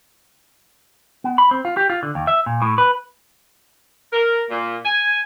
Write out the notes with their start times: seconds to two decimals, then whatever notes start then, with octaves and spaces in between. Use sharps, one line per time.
1.24 B3
1.38 B5
1.51 C4
1.65 F4
1.77 G4
1.90 F4
2.03 D3
2.15 D#2
2.27 E5
2.46 A#2
2.62 A2
2.78 B4
4.13 A#4
4.50 A#2
4.85 G#5